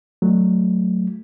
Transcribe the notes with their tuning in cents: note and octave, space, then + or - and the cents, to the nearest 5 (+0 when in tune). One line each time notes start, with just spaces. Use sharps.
F#3 +0 A3 +0